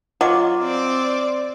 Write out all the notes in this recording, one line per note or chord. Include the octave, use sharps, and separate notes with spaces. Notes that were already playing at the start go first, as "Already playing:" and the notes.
F#3 F4 D#5 D6
C4 D5